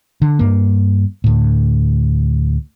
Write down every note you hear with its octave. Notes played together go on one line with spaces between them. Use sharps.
D3
G2 A#3
D2 A2